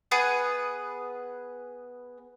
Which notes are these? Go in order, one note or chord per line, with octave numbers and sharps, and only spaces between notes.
B3 G#4 B4